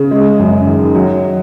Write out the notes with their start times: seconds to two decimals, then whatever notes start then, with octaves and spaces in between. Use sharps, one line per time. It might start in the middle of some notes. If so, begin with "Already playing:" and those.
Already playing: C#3
0.11 G#3
0.39 F#2
0.67 D#3
0.95 F#3